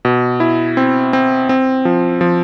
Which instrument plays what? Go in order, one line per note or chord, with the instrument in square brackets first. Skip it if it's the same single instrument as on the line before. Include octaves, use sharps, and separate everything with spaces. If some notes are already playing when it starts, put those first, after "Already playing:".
[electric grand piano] B2
E4
C4
C4
C4
F3
F3